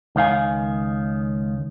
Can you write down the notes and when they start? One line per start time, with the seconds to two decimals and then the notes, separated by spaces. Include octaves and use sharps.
0.16 C#2 D#3 F5 G#5